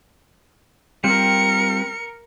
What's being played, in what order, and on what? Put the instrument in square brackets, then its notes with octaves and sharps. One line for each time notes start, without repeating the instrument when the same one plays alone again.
[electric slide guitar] G3 C4 F4 [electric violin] A#4 C#7